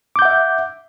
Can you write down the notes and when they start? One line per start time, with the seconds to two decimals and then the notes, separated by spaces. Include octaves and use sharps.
0.16 D6
0.19 G6
0.22 F#5
0.25 E5